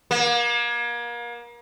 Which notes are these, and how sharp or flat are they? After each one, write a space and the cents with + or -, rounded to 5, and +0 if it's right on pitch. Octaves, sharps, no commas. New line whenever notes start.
A#3 +35